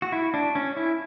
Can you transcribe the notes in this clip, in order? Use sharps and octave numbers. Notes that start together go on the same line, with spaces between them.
F#4
E4
D4
C#4
E4